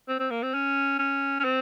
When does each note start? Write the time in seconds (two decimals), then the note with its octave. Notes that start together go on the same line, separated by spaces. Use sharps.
0.08 C4
0.19 C4
0.30 A#3
0.43 C4
0.54 C#4
0.99 C#4
1.40 C#4
1.44 C4